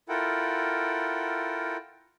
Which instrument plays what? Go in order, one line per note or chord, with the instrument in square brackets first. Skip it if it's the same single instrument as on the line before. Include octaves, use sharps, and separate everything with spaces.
[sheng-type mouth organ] E4 F4 A4 A#4 F#5 G5